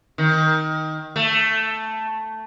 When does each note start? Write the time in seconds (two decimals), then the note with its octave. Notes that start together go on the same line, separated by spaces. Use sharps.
0.18 D#3
1.16 A3